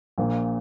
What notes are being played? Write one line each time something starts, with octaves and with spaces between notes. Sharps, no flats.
A#1 A#2 A#3